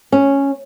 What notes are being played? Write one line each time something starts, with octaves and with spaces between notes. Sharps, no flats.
C#4